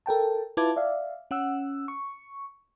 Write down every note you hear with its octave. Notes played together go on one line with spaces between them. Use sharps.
A4 A#4 G5 A5
E4 F4 B4 A5 D6 G#6
D5 E5 F5
C#4 F#5 E6
C#6